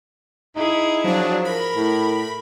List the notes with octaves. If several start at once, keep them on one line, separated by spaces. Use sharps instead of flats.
D#4 E4 G#4
F3 F#3 D4
A#4 B5
A2